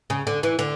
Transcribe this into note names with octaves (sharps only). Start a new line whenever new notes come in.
C#3
D3
E3
D3